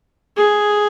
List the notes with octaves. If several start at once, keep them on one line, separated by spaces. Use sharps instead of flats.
G#4